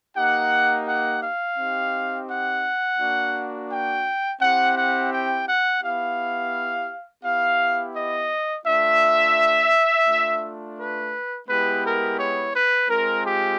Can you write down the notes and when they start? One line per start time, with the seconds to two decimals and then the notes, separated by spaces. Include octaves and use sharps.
0.16 A#3 D#4 G4 F#5
0.87 F#5
1.22 F5
1.58 C4 D#4 G4
2.28 F#5
2.99 A#3 D4 F#4
3.69 G5
4.40 C4 E4 G4 F#5
4.75 F#5
5.11 G5
5.46 F#5
5.82 B3 E4 G4 F5
7.23 B3 E4 G4 F5
7.94 D#5
8.65 A3 D4 F4 E5
10.06 A3 D4 F4
10.77 B4
11.47 G#3 B3 E4 G4 B4
11.83 A#4
12.18 C#5
12.54 B4
12.89 G#3 C4 F4 A#4
13.24 G4